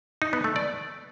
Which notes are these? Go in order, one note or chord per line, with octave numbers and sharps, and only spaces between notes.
D#4
B3
A3
D5